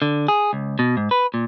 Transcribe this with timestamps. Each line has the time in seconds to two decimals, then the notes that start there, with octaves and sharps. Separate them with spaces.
0.02 D3
0.28 G#4
0.53 C#2
0.79 B2
0.97 G#2
1.11 B4
1.34 A#2